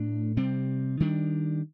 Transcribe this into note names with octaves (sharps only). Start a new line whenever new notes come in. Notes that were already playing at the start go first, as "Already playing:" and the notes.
Already playing: A2 A3 D4
C3 G3 C4
D#3 G3 D4